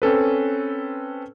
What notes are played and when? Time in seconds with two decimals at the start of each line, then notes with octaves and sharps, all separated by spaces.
0.02 C4 C#4 A4 B4